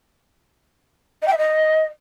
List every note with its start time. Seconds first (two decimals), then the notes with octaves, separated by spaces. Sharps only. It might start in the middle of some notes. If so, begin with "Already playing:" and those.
1.22 D#5
1.27 G5
1.33 E5
1.38 D#5